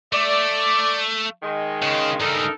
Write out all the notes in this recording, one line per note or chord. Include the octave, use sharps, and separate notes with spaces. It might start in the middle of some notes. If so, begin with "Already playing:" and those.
A3 D5
D#3 G#3
C#3
G2 C#3 D#4 A4 A#4